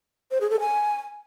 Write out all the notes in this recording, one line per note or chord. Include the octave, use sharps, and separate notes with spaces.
C5
G#4
A4
G#5